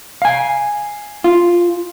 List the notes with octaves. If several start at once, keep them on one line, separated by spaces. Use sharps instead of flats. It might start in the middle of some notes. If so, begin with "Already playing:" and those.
F5 G#5
F4